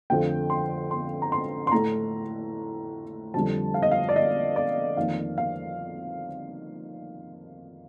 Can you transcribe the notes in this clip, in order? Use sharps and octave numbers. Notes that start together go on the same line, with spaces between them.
F2 D3 F3 A3 G5
C6
C6
A#5
C6
C6
A2 A3 A#5
F2 D3 G3 A5
F5
D#5
F5
D5
D#5
D5
F2 D#3 A#3 F5
F5